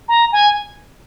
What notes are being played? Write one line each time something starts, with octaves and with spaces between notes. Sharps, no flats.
A#5
G#5